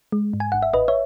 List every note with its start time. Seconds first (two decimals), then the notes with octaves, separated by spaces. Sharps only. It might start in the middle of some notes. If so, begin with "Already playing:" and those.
0.12 G#3
0.33 G#2
0.40 G#5
0.52 G#1 F#5
0.63 E5
0.73 A1 B4 D#5
0.88 C#5 E5